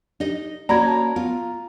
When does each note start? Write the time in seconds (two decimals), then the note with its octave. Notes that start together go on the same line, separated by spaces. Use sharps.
0.20 D4 D#4 G4 D#5
0.69 A#3 C#4 F#4 D5 A#5 B5 G#6
0.87 A5
1.16 B3 F4